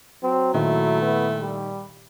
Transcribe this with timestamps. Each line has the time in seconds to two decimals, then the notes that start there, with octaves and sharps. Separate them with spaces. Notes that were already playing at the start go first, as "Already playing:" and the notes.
0.23 F#3 C4
0.54 A#2 D#3 A3 E4
1.02 B3
1.40 G3